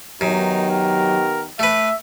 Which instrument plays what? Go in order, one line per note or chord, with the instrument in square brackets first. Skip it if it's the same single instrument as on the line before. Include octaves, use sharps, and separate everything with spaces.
[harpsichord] F#2 [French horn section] D#3 B3 G4 [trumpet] D#4
[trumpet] A#4
[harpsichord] A3 B4 [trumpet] E5